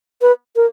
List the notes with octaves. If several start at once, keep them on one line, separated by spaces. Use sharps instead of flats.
B4
A#4